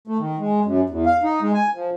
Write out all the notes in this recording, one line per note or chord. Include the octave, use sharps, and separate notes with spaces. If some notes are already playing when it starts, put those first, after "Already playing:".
A3
D#3
G#3
F#2
E2
F5
D#4
G#3
G#5
F3